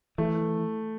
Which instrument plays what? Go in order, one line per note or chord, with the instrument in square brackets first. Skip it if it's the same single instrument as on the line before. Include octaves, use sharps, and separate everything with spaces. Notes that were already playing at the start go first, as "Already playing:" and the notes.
[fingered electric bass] E3 [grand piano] A3